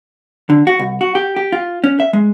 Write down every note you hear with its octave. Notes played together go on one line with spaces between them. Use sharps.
D3
F#4
C2
F#4
G4
G4
F4
C#4
E5
G#3